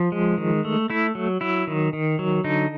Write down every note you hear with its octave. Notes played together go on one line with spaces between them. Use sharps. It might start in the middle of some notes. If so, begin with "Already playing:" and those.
Already playing: F3
G#3
D#3
A3
A3 E4
F#3
F#3 E4
D#3
D#3
F#3
D3 D#4